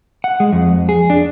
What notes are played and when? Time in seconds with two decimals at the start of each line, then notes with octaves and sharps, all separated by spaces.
0.24 F#5
0.40 G#3
0.53 F2
0.89 G#4
1.10 D4